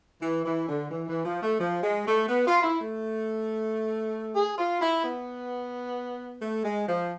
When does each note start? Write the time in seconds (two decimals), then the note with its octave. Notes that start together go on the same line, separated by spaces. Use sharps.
0.22 E3
0.46 E3
0.69 D3
0.91 E3
1.08 E3
1.25 F3
1.43 A3
1.60 F3
1.83 G#3
2.06 A3
2.29 B3
2.47 F4
2.63 E4
2.81 A3
4.35 G#4
4.58 F4
4.81 E4
5.04 B3
6.42 A3
6.64 G#3
6.88 F3